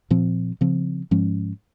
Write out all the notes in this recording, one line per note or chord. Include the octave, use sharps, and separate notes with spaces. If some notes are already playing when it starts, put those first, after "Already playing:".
A#2 F3 C4
C#3 F3 C4
G#2 F3 G#3 C#4